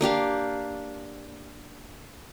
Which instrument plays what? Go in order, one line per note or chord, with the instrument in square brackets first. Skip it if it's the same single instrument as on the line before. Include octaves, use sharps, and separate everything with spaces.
[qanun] A#3 D4 G4 F5